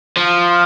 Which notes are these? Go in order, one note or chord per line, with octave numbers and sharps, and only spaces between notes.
F3